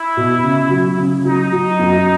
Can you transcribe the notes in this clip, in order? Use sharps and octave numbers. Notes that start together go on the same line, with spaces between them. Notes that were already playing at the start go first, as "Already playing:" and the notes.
Already playing: E4
B2
C#3
F#3
C#3
F#3 D#4
F#3
F#2